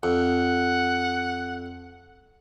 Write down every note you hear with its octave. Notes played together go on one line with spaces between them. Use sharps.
F2 F#5